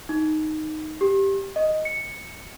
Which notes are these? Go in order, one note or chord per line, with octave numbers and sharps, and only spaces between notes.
D#4
G4
D#5
C#7